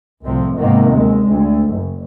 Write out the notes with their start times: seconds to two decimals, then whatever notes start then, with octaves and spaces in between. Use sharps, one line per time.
0.22 C2 A2 C3 F3
0.58 G#2 C3 D#3 A#3 B3
0.91 D#2 G#3
1.27 D2
1.73 F#1